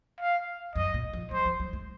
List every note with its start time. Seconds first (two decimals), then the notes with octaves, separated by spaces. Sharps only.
0.20 F5
0.75 F#2 D#5
0.94 A#2
1.13 F3
1.31 F#3 C5
1.45 F3
1.60 F#3
1.73 G#3